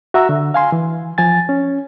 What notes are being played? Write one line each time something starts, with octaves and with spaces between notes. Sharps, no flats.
F#4 E5 A#5 E6
D3
F5 G#5 C6
E3
F3 G#5 A6
C#4